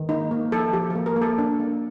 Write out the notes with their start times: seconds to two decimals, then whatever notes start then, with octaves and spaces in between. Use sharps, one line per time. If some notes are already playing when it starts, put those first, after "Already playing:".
Already playing: D#3
0.09 A#3 D#4
0.31 A#3
0.52 F3 A4
0.73 F3 G4
0.90 A4
0.96 A#3
1.06 A#4
1.16 A#3
1.22 A4
1.38 A#3 D4
1.59 A#3